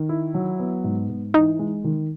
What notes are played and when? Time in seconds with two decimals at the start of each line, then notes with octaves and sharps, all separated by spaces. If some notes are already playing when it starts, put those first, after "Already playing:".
Already playing: D#3
0.09 E4
0.34 F#3
0.60 B3
0.84 G#2
1.10 G#2
1.34 E3 D#4
1.59 G#3
1.84 D#3